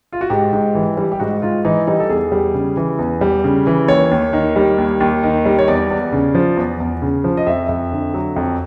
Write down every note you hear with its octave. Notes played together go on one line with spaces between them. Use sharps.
F4
F#4
G#2 G4
G#2
E3
G3
G4
G#2 F#4
G#2 F4
E3 D#4
G3 D#4
A4
E2 G#4
G3
C#3
E3
E2
G3
C#3
E3
D#2 C#5
D#2
D#3
G3
D#2
D#2
D#3
G3
C#5
E2 D5
E2
C#3
F3
E2
E2
C#3
F3
D#5
F2 E5
F2
D3
F#3
F2